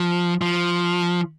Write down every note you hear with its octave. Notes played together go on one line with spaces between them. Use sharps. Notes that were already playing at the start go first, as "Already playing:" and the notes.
Already playing: F3
F3